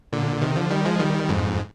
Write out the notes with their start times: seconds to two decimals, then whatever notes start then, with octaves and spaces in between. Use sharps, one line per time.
0.13 A#2 D3
0.41 C3 D#3
0.56 D3 F3
0.71 D#3 G3
0.85 F3 G#3
0.99 D#3 G3
1.29 F2 G#2